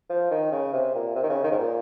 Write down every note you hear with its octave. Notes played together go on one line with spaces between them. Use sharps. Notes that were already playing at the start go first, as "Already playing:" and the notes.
F3
D#3
C#3
C3
A#2
C3
D#3
C#3
D#3
G#2
A#2